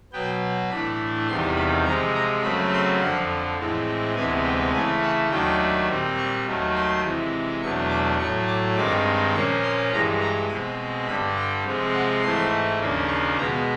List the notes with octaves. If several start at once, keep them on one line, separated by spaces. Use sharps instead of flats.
B2 F#3 B3 G5
A2 E3 A3 D4 B5
E2 C3 D#3 G3 C6
B5
C3 F3 G#3 A#5
A#5
F#2 C#3 F#3 A3 C4 B5
C6
F2 D3 F3 F#5
A2 E3 G#3 C4
D2 C3 E3 G#3 B3 G#5
G5
C#3 E3 A3 G#5
F#5
D#2 D#3 F#3 A3 D4 G5
A#2 G3 C4
C#6
D#2 D#3 F#3 A3
C6
C3 E3 G#3
E2 B2 F#3 A3 D4 C#6
D6
A2 F#3 A3 C#6
D6
G2 D#3 G#3 C4 D6
A#2 F3 A#3 C#4 C#6
C6
G2 E3 G#3 A#5
A#5
B2 G#3 C4 B5
G2 D3 G3 B5
G5
C3 F3 G#3 C4
F#5
G#2 E3 A3 C6
D#2 C#3 F3 A#3 D4
C#6
B2 G#3 B3 A#5